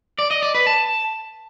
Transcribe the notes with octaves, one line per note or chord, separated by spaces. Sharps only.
D5
D#5
D5
B4
A5